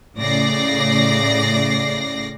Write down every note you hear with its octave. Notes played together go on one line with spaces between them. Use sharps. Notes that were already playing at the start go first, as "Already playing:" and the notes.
A2 C#3 D5 A#6 C7